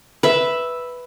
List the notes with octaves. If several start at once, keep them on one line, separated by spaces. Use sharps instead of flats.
B4 E5